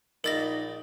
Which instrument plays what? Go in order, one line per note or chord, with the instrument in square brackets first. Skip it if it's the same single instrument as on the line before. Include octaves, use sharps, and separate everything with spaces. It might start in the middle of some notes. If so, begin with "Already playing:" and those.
[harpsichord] A#1 B5 D6 [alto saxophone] D#4 [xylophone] A#4 A6 A#6